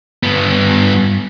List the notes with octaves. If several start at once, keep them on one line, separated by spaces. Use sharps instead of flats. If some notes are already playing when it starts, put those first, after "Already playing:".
G2 B3